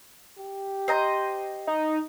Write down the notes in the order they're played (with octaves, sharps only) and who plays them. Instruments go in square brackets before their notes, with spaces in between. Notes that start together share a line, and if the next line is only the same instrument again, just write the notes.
[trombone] G4
[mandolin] C5 D#5 A#5
[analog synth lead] D#4